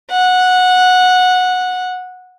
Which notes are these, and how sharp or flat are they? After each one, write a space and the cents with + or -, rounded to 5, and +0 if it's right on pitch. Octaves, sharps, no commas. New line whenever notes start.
F#5 -15